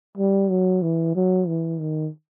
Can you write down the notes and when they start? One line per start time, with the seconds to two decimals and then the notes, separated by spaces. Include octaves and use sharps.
0.18 G3
0.50 F#3
0.82 E3
1.16 F#3
1.47 E3
1.80 D#3